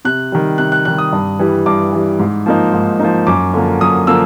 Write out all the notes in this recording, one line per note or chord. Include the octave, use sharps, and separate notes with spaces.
C3 F#6
D#3 G3
C3 F#6
F#6
D#3 G3 F#6
D#6
G2
E3 G3
G2 D6
E3 G3
G#2
F3 A#3 D#4
G#2
F3 A#3 D#4
F#2 D6
D3 F3 A#3
F#2 D#6
D3 F3 A#3 E6